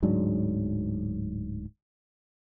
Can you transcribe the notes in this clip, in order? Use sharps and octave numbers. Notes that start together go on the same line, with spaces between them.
D1 G#2 F#3 D4